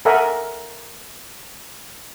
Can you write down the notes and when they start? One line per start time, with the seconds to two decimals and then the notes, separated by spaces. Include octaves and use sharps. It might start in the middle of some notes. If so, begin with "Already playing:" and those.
0.05 A4 A#4 D#5 E5 F#5 G#5